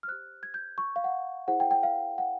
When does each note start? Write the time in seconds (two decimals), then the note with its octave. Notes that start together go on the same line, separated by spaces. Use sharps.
0.03 F6
0.08 G4 C5 F#6
0.43 G#6
0.54 G6
0.78 C#6
0.96 F5
1.04 F#5
1.48 E4 G#4 C5 F#5
1.60 G5
1.71 G5
1.83 F5
2.18 F#5